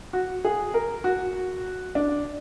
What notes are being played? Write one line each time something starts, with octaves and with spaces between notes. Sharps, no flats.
F#4
G#4
A#4
F#4
D4